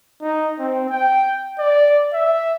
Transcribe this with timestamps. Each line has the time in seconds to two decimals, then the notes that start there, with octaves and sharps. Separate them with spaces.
0.22 D#4
0.59 C4
0.90 G5
1.59 D5
2.13 E5